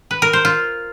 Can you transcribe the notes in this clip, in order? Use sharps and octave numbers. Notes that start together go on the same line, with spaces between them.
B4
A#4
C5
F4